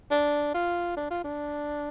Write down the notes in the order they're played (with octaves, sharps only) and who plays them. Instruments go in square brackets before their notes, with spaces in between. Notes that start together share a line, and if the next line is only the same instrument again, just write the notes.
[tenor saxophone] D4
F4
D4
F4
D4